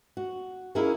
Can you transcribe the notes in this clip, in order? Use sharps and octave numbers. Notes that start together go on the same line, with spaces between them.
F#4
A#3 C#4 D#4 E4 G#4 A#4